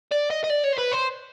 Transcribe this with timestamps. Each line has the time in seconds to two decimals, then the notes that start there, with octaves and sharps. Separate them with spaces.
0.12 D5
0.31 D#5
0.44 D#5
0.50 D5
0.64 C#5
0.73 C5
0.79 B4
0.93 C5